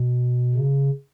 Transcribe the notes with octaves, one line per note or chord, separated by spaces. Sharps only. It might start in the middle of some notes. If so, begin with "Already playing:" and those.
Already playing: B2
C#3